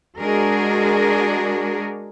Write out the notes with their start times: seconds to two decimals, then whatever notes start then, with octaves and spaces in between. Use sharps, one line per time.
0.21 G#3 D4 F#4 G#4 A#4